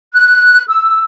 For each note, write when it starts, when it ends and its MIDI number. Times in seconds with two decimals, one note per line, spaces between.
0.13 0.64 90
0.68 1.03 88